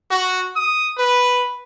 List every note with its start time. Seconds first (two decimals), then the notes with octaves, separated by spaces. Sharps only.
0.11 F#4
0.56 D#6
0.98 B4